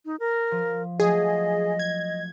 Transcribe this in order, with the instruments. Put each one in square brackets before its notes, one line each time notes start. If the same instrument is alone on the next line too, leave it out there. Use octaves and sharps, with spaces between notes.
[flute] D#4
A#4
[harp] F3
[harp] F3 F#3 A3 [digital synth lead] G#4 [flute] D#5
[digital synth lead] G#6